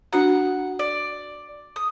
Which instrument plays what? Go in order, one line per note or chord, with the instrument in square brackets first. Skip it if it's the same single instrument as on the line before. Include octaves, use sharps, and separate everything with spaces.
[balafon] D4 F#4 A#5 [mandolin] F#5
[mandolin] D5
D#6